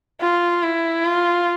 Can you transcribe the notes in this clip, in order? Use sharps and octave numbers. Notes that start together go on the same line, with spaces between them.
F4
E4
F4